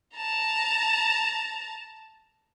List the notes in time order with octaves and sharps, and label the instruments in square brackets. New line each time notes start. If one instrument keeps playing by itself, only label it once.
[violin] A5 A#5